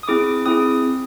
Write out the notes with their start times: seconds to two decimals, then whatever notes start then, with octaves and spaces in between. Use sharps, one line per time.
0.03 D#6
0.08 C4 E4 G#4 D6
0.46 C4 E4 G#4 D#6